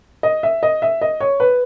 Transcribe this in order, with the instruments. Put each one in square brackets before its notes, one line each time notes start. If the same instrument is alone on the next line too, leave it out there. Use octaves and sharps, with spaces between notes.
[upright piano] D#5
E5
D#5
E5
D#5
C#5
B4